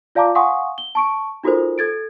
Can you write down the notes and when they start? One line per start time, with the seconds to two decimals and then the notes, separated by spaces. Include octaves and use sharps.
0.15 F4 D5 F5 A5 A#5 D6
0.35 F5 F#5 G#5 C6 C#6 D#6
0.78 G7
0.95 A5 C#6 D7
1.43 D#4 F4 F#4 A4 A#4 C5
1.78 A4 G#6 A6 D7